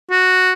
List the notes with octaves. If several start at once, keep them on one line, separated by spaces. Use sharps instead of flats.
F#4